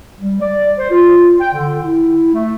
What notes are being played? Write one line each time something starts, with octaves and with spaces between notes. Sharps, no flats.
G3
D5
C5
F4
G5
D3
E4
A3